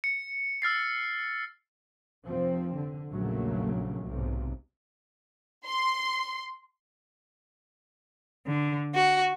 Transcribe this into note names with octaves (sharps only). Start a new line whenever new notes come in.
C#7
E6 F6 A6 C7
F1 F3 C4
D3
A#1 E2 C#3 F#3 A3 A#3
B1 G#2 C3
C6
D3
F#4